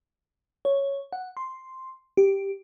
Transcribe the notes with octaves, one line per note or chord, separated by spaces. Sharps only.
C#5
F#5
C6
G4